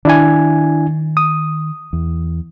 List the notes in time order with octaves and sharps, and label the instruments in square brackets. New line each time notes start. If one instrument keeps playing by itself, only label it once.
[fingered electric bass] D#3 [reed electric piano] D4 E4 G#5
[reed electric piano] D#6
[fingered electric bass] E2